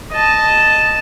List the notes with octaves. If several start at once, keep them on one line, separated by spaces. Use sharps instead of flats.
D#5 A5